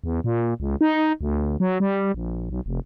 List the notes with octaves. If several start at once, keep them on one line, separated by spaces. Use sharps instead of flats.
E2
A#2
C#2
D#4
D2
F#3
G3
A#1
B1
F1